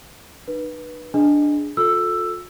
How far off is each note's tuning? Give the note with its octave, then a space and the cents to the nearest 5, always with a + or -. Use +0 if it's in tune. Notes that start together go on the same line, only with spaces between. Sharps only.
D#4 -45 B4 -20
D4 +0 G#4 +0 D#5 +0
F4 +40 A4 +0 E6 +10